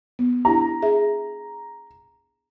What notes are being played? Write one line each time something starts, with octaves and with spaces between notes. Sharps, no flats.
B3
D4 E4 G4 A#5
G#4 E5